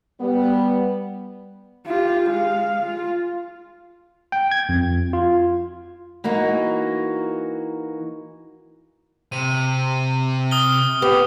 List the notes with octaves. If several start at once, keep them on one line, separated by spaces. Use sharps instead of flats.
G3 B3
F4 G4
G#3 F5
F4
G5
G#6
F2
F4
E3 A#3 D#4 F#4
C3 D#7
D#6 F6 G7
B3 G4